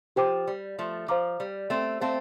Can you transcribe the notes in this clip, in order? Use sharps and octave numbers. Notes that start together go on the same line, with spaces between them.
F3 G4 C5 G5 D6
G3
F3 A3
F3 C5 F5 A#5 D6
G3
A3 C4
A3 C4 C5 F5 A5